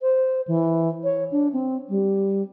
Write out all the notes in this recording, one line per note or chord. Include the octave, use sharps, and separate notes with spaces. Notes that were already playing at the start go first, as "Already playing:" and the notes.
C5
E3
C#5
D4
C4
G3